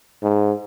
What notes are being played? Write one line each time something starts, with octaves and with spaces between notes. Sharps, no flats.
G#2